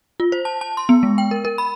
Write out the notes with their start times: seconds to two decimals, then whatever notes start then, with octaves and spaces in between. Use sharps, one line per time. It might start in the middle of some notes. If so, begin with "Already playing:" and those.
0.20 F4
0.32 C5
0.45 A5
0.61 A5
0.77 C6
0.89 B3
1.03 G#3
1.18 G5
1.31 A#4
1.45 A#4
1.58 B5